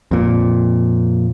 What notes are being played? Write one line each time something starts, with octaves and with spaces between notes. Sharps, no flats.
F2 A#2